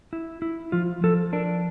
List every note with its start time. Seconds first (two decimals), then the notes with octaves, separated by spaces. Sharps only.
0.13 E4
0.42 E4
0.72 F3 F4
1.04 F3 A4
1.33 D4 A#4